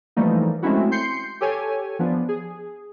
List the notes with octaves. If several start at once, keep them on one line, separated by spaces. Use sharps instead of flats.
E3 F3 G3 A3 A#3 D#4
G#3 A3 C4 C#4 E4 F#4
C6 G6 C7 C#7
G4 A4 C#5 G#5
F3 B3 D4
G#4